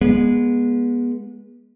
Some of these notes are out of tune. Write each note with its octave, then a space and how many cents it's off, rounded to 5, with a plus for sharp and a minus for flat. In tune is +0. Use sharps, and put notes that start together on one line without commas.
G#3 -10 B3 -30